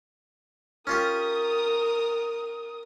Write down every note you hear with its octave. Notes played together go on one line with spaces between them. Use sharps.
C#4 F4 G4 A#4 D#6